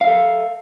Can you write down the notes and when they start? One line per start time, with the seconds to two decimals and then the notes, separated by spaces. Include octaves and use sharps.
0.01 F5
0.04 E5
0.07 A4